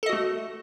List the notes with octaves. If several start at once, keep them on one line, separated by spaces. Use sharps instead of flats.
A3 F#4 A4 D#5